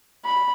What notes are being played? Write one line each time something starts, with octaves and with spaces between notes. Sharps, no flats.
B5